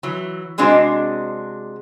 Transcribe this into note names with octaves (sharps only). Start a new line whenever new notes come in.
E3 F#3
C3 G#3 C4 D4 F#4 D#5